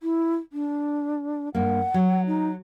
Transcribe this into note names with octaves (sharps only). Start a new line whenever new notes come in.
E4
D4
G2 A#3 F#5
F#3
D#4